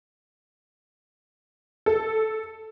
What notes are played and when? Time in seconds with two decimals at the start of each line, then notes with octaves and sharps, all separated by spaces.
1.86 A4